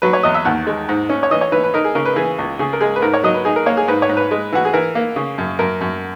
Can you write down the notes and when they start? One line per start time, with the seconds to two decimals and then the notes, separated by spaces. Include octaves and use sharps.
0.02 F#3 B4
0.13 C#5
0.23 E2 D#5
0.34 E5
0.45 D#2 F#5
0.67 G#3
0.89 G#2
1.09 C#4
1.23 C#5
1.31 E3 D#5
1.41 C#5
1.52 E3 B4
1.64 B4
1.74 D#4 A#4
1.84 G#4
1.95 C#3 A#4
2.05 B4
2.16 E3 G#4
2.38 C#2
2.59 C#3 G#4
2.73 A#4
2.80 G#3 G#4
2.96 B4
3.02 G#2 A#4
3.14 C#5
3.24 F#3 D#5
3.34 B4
3.45 D#4 G#4
3.56 A#4
3.66 A#3 C#5
3.77 G#4
3.88 G#2 B4
4.02 C#5
4.09 G#2
4.17 B4
4.31 G#3
4.53 E3 F#4
4.65 G#4
4.73 E3 A#4
4.95 A#3
5.16 C#3
5.38 F#2
5.59 F#2 A#4
5.81 F#2